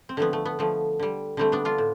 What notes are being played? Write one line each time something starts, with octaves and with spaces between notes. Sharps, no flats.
C4
D3 F3 A3 B3
A3
B3
D3 F3 A3
D3 G3
D3 G3 A3 C4
B3 D4
D4 F4
A2